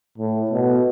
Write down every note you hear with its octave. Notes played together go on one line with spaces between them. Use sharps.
A2
B2